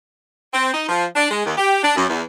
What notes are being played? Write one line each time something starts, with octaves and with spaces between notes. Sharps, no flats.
C4
D#4
F3
D4
G#3
D#2
G4
D4
F#2
E2